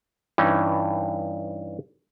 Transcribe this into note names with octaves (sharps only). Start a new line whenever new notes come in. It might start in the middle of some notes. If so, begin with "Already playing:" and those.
G2 E3 C#4 D#4